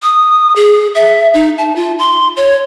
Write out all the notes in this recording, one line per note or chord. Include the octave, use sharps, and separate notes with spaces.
D#6
G#4
E5
D#4
A5
F4
C6
C#5